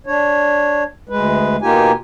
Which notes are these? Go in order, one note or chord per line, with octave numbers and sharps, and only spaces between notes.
D4 C#5
D2 G#3 B4
B2 A#3 D#4 F4 G4 G#5